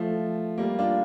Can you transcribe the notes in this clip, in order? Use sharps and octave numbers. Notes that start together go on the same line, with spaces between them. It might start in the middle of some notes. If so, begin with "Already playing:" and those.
Already playing: F3 A3
G3 A#3
D4 F4